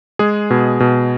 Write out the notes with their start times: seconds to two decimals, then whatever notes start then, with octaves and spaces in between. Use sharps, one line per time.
0.19 G#3 G#4
0.50 B2
0.80 B2